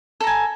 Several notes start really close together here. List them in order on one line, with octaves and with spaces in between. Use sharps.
A4 A#5 G#5